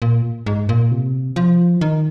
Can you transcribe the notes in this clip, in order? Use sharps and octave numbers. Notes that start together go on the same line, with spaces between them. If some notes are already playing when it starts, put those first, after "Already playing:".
A#2
G#2
A#2
C3
F3
D#3